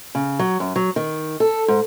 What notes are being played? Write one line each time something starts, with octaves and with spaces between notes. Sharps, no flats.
C#3
F#3
F#2
F#3
D#3
A4
G#2